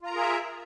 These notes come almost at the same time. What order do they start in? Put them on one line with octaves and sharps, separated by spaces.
F4 A#5 A#4 G#4 E5